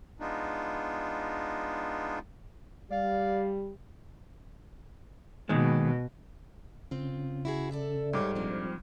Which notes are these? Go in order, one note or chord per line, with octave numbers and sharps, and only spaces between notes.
G#3 B3 D4 D#4 F4
G3 D5 F5
D#2 B2 D#3 G#3
C#3 C4 F4
E4 F#4 G#4
A4 D5 E5
G#2 G3 G4 A4 C#5 D6
A#2 F3 C4 D4